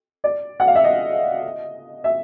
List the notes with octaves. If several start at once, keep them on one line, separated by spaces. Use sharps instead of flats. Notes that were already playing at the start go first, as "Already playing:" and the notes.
D5
F#5
F5
E5
D#5
E5